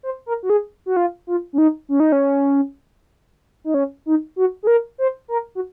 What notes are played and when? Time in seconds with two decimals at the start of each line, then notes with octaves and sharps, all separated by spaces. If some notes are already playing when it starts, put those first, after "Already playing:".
0.03 C5
0.26 A#4
0.43 F#4
0.50 G#4
0.86 F#4
0.97 F4
1.27 F4
1.53 C#4
1.58 D#4
1.89 C#4
2.00 D#4
2.12 C#4
3.64 D#4
3.74 C#4
4.06 D#4
4.36 F#4
4.63 G#4
4.67 A#4
4.98 C5
5.28 A#4
5.55 F#4